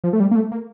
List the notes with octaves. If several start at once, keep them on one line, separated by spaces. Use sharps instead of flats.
F3
A3
G3
A#3
A3
A#3